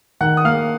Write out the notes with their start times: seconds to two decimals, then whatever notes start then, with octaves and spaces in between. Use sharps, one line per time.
0.21 D#3 F#5 F#6
0.37 D#6
0.44 A#3 F5 F6